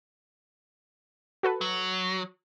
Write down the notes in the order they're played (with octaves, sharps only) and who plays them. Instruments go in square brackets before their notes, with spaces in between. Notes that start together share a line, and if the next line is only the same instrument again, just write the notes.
[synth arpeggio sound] F#4 A4 B4
[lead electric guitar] F#3